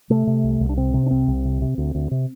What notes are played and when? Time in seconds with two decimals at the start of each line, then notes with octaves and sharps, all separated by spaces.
0.10 C3 A3
0.27 C3
0.44 C2
0.60 C2
0.69 D4
0.77 C3 C4
0.94 C3
1.06 D4
1.11 C2 C4
1.28 C2
1.45 C3
1.62 C3
1.78 D2
1.95 D2
2.11 C3